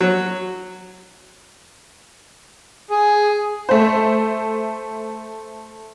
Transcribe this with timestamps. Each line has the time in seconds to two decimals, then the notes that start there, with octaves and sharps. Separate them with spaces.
0.01 F#3
2.90 G#4
3.69 A3 C5